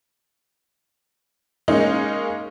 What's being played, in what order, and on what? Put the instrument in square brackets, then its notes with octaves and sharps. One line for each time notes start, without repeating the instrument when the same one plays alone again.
[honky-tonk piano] G#3 A#3 C#4 D#4